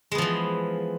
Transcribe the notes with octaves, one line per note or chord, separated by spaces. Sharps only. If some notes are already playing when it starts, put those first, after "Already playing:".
E3 F3 G#3 B3